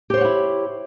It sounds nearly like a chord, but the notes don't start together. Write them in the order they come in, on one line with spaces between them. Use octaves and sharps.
G4 C5 C#5 F#5 E4